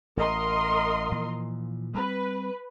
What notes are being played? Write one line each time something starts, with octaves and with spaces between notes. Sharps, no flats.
A1 A#4 D#5 C6
A#2 E3 F3
G3 C4 B4